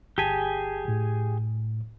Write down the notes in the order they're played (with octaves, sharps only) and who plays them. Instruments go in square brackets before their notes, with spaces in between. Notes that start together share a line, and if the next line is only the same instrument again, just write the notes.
[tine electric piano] G1 A5 B6 [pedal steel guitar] G4 G#4 G#5
[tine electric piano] A2